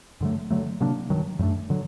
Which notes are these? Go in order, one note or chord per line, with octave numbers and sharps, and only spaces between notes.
G2 D3 F#3 A3
D3 F#3 A3
C3 F#3 A#3 D4
G2 D#3 F#3
F#2 F#3 A3 D4
D3 F#3